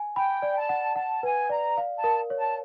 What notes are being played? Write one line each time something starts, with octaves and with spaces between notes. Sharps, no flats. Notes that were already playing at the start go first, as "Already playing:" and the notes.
Already playing: G#5
G5 B5
D5
A5
F#5
F#5 A5
B4 G#5
D5 A#5
F5
A5
A#4
C#5
A5